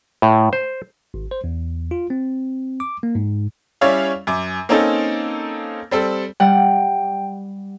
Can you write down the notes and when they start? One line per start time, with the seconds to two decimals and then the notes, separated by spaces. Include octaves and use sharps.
0.22 A2
0.53 C5
1.14 G#1
1.31 C5
1.44 E2
1.91 F4
2.10 C4
2.80 D6
3.03 A#3
3.15 G#2
3.81 G3 C#4 E4 C#5 D5 F5
4.27 F#2 D6
4.69 A#3 C4 C#4 D#4 A4
5.91 G3 C4 A4
6.40 G3 F#5 G5